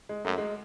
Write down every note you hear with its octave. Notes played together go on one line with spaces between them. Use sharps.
G#3
F#2 A3
G#3